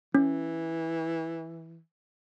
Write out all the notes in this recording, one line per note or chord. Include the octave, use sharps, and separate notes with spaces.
E3 C#4